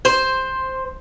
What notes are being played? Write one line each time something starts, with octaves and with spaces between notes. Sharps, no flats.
C5